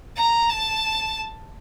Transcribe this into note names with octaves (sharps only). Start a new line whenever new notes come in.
A#5
A5